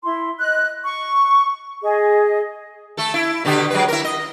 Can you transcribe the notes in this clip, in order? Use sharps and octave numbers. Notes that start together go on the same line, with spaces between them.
E4 C6
D#5 F#6
C#6
G#4 D#5
A3 A4
E4
B2 D3 G4
F#3 G#3 B4
E4 A#4
D#5